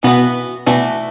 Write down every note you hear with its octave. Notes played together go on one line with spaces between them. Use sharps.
B2 E3 B3 F#4 B4
B2 E3 A3 D4 F#4